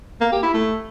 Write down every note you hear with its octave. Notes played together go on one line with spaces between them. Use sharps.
A#3
G4
E4
A3